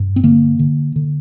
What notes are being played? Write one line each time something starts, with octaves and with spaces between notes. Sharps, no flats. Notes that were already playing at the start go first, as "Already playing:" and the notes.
Already playing: G2
C4
D3 A#3
D3
D3